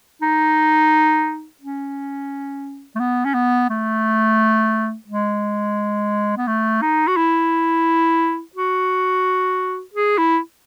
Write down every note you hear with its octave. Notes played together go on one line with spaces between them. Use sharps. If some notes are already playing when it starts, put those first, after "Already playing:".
D#4
C#4
A3
B3
C#4
B3
A3
G#3
B3
A3
D#4
F#4
E4
F#4
G#4
E4